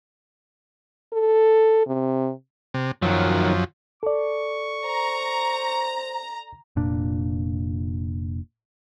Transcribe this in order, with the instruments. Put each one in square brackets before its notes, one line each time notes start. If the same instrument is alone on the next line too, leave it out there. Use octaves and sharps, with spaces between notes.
[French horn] A4
C3
[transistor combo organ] C3
[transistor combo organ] F#2 F3 [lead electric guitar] D#3 F#3
[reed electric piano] A4 D5 [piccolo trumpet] C#6
[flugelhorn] C5 [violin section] A#5
[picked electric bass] F1 A#2 D4